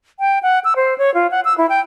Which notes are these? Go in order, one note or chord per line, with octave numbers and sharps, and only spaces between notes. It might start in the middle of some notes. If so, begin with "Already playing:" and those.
G5
F#5
E6
C5
C#5
F4
F#5
E6
E4
G5